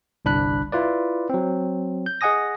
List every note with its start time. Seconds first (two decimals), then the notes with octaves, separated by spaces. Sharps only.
0.25 G1 C2 D4 B5 F#6
0.72 E4 F4 B4 D5
1.29 F#3 C4
2.06 G6
2.21 G#4 D#5 F#5 G#5 D#6 A#6